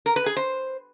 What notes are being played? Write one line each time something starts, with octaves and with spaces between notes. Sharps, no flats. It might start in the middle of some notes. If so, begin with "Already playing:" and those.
A#4
B4
G#4
C5